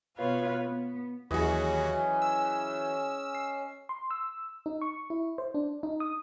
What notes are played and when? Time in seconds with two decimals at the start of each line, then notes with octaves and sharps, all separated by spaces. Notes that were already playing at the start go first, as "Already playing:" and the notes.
0.17 B2 B3 F4 B4 C#5 F5
0.65 B3
1.31 D#2 E3 F#3 C#4 F#4 G#4 D#5
2.22 E6
3.35 C7
3.89 C6
4.11 E6
4.66 D#4
4.82 C#6
5.10 E4
5.38 C5
5.54 D4
5.83 D#4
6.00 D#6